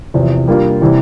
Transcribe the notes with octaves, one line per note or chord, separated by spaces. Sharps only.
E2 C3 F3
G3 A#3 D4 F4
C3 E3 G3